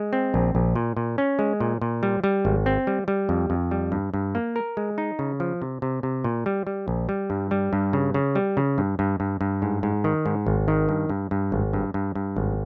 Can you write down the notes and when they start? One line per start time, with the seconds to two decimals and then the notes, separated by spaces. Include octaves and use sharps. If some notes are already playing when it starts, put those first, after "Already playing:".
Already playing: G#3
0.13 C4
0.34 A#1
0.55 A#1
0.75 A#2
0.97 A#2
1.18 C#4
1.39 G#3
1.60 A#2
1.82 A#2
2.03 G3
2.24 G3
2.45 G#1
2.66 C4
2.87 G3
3.08 G3
3.29 F2
3.50 F2
3.71 G3
3.92 G2
4.14 G2
4.35 A#3
4.56 A#4
4.77 G#3
4.98 D#4
5.19 C#3
5.40 F3
5.62 C3
5.82 C3
6.03 C3
6.24 A#2
6.46 G3
6.67 G3
6.88 A#1
7.09 G3
7.30 G2
7.51 G3
7.73 G2
7.93 C#3
8.14 C#3
8.35 G3
8.57 C#3
8.78 G2
8.99 G2
9.20 G2
9.41 G2
9.62 G#2
9.83 G#2
10.04 D#3
10.26 G#2
10.47 G#1
10.68 D#3
10.89 G2
11.09 G2
11.31 G2
11.52 G#1
11.73 G2
11.94 G2
12.15 G2
12.36 G#1